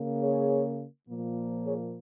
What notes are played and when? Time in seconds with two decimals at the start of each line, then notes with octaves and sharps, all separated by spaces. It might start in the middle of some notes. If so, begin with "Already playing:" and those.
Already playing: C#3 A#3
0.22 G#4 C#5
1.07 A#2 F3 A#3
1.64 G#4 C#5